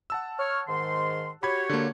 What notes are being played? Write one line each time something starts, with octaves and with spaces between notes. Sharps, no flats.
F#5 A5 E6
C#5 F6
G#2 D#3 C6
F#4 G4 C#5 B5 G#6
D3 A#3